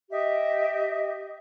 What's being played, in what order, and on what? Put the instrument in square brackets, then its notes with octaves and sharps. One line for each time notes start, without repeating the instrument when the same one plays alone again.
[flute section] G4 D#5 E5